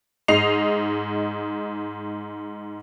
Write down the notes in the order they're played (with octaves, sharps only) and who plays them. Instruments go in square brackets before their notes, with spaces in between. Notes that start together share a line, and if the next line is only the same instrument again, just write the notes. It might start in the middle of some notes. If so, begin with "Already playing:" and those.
[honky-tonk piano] G#2 D#5 C7 F7